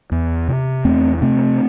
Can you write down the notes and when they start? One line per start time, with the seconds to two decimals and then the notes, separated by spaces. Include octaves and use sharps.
0.12 E2
0.48 C3
0.85 E2 A3 C4
1.22 C3 A3 C4